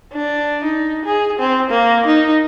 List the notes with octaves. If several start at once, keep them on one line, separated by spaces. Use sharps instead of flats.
D4
D#4
G#4
C4
A#3
D#4